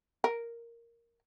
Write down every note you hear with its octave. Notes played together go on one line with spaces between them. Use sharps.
A#4